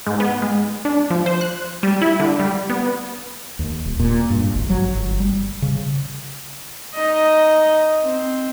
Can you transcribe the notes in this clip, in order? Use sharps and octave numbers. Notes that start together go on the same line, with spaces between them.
G#2
B3
G#3
D4
F3
C5
F#6
G3
E4
D3
G3
B3
D#2
D#1
A#2
G2
G#1
F#3
G1
G3
C#3
D#4 D#5
C4